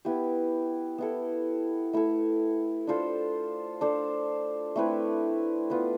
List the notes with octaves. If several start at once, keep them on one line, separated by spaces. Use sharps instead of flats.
B3 E4 G4
B3 E4 A4
A3 E4 A4
D4 F4 A4 C5
D4 A4 C5
A3 C4 E4 B4
B3 F4 B4 D5